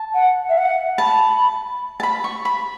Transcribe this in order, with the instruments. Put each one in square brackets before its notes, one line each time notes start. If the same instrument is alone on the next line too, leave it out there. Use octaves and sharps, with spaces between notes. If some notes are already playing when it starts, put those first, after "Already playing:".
Already playing: [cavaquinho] A5
[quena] F#5
E5
F#5
[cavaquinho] A5 [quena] B5
[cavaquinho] A5
B5
C#6
B5